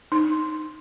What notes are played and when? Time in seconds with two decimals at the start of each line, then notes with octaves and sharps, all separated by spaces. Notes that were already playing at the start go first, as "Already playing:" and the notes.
0.12 D#4